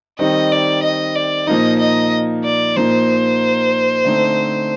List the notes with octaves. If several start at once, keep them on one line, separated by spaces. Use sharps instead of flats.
D#3 G3 C4 D#4 D#5
D5
D#5
D5
A#2 F3 A#3 D#4 D#5
D#5
D5
A#2 F3 A#3 D#4 C5
D3 A3 C4 D#4